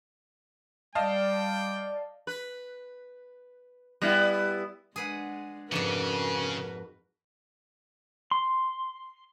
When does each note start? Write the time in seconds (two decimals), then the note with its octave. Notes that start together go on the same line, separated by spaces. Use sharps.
0.95 G3 D5 D#5 F5 G5 A5
2.27 B4
4.02 G3 B3 E4
4.96 G#3 D4 G#4 B4 F#5
5.72 F2 G#2 C#3 F#4 A#4 B4 D5
8.31 C6